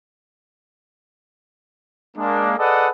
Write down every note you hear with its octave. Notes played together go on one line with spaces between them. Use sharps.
G#3 A#3 D4
G#4 A4 B4 D5 D#5 F#5